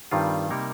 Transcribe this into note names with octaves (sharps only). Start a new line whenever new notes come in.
G2 D#3 G3 C4 F4
C3 G3 A#3 D#4 A#4